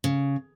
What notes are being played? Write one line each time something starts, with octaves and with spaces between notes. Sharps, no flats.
C#3